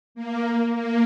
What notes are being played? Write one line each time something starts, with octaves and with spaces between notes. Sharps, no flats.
A#3
A#3